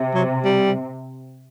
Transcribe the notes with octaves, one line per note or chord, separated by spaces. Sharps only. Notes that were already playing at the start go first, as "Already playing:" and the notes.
Already playing: C3
F#3
G3